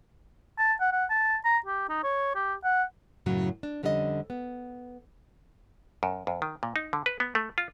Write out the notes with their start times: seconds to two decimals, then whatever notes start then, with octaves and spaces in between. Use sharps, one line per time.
0.58 A5
0.81 F#5
0.92 F#5
1.10 A5
1.45 A#5
1.66 G4
1.89 D#4
2.04 C#5
2.35 G4
2.64 F#5
3.26 F#2 A2 C#3 F#3
3.63 D4
3.83 F2 D3 G3 C#4 F4 D#5
4.30 B3
6.03 F#2
6.27 F2
6.42 D#3
6.63 A#2
6.76 D#4
6.93 D3
7.06 B4
7.20 B3
7.35 A3
7.58 F4